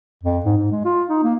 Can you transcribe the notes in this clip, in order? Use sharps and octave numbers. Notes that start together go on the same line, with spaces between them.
F2
G#2
G#2
G#3
F4
D#4
A#3